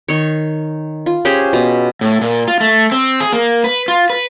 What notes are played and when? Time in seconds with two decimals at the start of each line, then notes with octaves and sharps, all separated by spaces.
0.08 D#3 C#5
1.06 F4
1.25 C#4 G4 G#4 C5
1.53 B2
2.01 A2
2.21 A#2
2.48 F4
2.61 A3
2.92 C4
3.20 G#4
3.33 A#3
3.64 B4
3.88 F4
4.10 B4